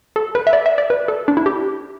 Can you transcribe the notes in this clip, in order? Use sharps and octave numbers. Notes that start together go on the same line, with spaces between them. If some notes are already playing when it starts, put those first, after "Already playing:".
A4
B4
E5
D5
E5
D5
B4
A4
D4
E4
G4